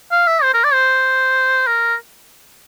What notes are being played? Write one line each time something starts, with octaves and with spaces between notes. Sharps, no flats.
F5
E5
C5
A#4
D5
C5
A#4